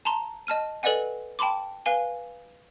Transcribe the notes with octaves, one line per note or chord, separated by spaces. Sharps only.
A5 A#5 C6
D#5 A5 F6 D#7
A4 B4 D5 D#5 F#5 G#5
G5 A5 B5 C6 D6
B4 F5 G#5 G7